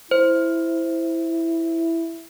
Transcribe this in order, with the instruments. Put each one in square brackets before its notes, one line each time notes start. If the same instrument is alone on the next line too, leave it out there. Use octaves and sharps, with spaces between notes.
[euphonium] E4 [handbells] C5